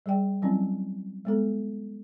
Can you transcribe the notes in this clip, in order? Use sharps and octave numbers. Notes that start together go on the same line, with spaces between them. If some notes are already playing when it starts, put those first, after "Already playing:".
G3 G#4 D5 G5
E3 F#3 G3 C4 C#4 E4
G#3 B3 A4